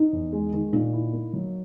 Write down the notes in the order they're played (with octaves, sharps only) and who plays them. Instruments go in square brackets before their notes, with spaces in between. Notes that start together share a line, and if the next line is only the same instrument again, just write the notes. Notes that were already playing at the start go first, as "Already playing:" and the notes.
Already playing: [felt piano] D#4
[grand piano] E2
G#3
D#3
[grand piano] A#2 [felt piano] D#4
[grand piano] E4
A#3
F#3